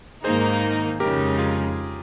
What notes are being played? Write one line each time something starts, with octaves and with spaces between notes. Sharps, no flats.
G#2 D#3 A#3 D#4 G#4 C5
F2 C#3 G#3 D#4 G4 A#4
F4 G#4